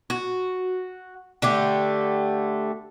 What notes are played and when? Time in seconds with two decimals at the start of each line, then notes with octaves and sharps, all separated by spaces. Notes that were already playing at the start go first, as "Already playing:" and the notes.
0.10 F#4
1.42 D3 A3 G4